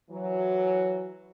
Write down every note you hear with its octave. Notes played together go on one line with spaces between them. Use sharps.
E3 F#3